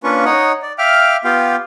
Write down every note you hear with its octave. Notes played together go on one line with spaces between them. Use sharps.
A#3 C#4 D4 F4 B4 C#6
D#4 C#5 D#5 F#5
D5
E5 F5 G5 D6 F6
B3 F4 G4 F5 G5